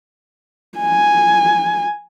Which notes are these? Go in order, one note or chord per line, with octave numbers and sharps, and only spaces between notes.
G#5